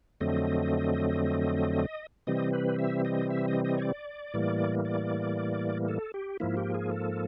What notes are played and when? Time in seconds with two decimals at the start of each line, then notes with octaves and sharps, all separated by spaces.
0.20 F2 D3 F#3 A3 C4 D#5
2.27 C3 E3 G3 C4 D#5
2.53 B4
2.79 E5
3.05 D#5
3.30 E5
3.48 D#5
3.65 D#5
3.77 C#5
3.82 D5
4.34 A2 E3 G3 A#3
4.85 D5
5.88 A4
6.14 G4
6.40 G#2 F3 A#3 E4
6.57 G4
6.74 G#4
6.91 A4